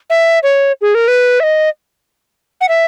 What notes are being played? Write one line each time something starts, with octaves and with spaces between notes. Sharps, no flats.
E5
C#5
G#4
A#4
B4
E5
D#5
F#5
E5